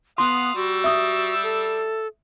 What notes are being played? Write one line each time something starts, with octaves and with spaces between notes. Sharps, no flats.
B3 F5 F#5 C6 D#6
G3 F#4 E6
E5 D#6
A4